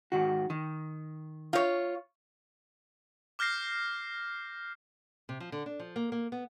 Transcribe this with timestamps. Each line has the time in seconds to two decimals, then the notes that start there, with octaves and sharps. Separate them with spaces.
0.12 G#2 D#3 F#4
0.50 D#3
1.53 F4 C#5
3.39 D6 F6 G6 A#6 C7
5.29 C3
5.40 F3
5.52 D3
5.66 D4
5.80 F3
5.96 A#3
6.12 A#3
6.32 B3